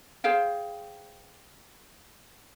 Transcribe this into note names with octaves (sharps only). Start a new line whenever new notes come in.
G#4 C5 F5 G5